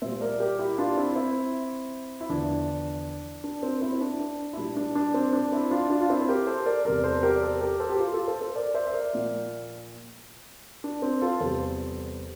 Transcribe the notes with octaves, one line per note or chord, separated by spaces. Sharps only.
A#2 G3 C5 E5
A#4 D5
G4 A#4
E4 G4
D4 F4
C4 E4
C4 E4
E4
E2 D3 F3 D4
D4
C4
C4 E4
C4
D4
D4
E4
A#2 G3 D4
D4
D4
C4
D4
C4 E4
D4 F4
D4 F4
F4
C4 E4
C5
G4 A#4
A4 C5
A#4 D5
E2 C3 G3 A#4 D5
A4 C5
G4 A#4
D5
A4 C5
G4 A#4
A4 C5
G4
F4 A4
F4 A4
A4 C5
A4 C5
A#4 D5
C5 E5
E5
A#4 D5
A#2 F3
D4
C4
F4 A4
E2 C3 G3 A4 C5